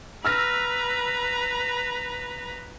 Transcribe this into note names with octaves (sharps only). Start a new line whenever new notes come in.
B4 A#5 E6 F6 A#6